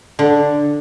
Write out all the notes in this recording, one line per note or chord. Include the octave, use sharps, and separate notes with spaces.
D3